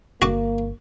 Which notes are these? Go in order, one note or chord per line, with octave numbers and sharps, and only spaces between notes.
G1 A#3 F#4 D6